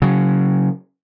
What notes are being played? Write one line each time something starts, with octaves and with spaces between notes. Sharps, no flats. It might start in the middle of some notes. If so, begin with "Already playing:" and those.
C#3 F#3